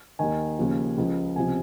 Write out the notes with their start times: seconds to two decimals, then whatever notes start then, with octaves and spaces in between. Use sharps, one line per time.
0.19 D#2 D#3 G#5
0.58 D#2 C#3 F3
0.97 C#2 C#3 F3
1.36 C#2 C3 F3 G#5